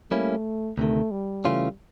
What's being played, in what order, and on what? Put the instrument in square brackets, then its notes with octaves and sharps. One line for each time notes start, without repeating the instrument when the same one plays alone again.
[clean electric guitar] G3 A#3 C#4 E4 [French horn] A3
[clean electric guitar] D2 C3 D#3 [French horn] A3
[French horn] G3
[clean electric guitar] C#3 E3 A3 C#4 F4